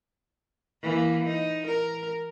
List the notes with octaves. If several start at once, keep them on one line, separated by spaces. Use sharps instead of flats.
E3 A#3
D#4
A#4